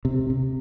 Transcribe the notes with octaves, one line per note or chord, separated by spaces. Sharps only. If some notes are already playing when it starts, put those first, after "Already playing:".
C3
C3